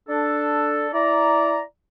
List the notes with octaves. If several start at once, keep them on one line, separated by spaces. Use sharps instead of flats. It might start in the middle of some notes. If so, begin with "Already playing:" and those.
D4 A4
E4 D5 A#5